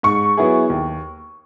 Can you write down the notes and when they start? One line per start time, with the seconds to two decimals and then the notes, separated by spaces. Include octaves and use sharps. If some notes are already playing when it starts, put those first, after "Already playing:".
0.03 G#2 C#6
0.37 F#3 B3 E4 G#4
0.70 D#2